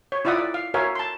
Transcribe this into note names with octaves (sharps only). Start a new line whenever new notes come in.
C#5
E4 F4 D5 E5 F#5 D#6
D5
F5
F#4 A#4 C#5 E5 F5 G#5
A5 C6